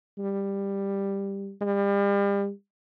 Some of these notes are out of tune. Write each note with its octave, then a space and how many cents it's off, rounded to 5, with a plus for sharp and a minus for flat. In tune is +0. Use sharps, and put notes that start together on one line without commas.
G3 +10
G3 +35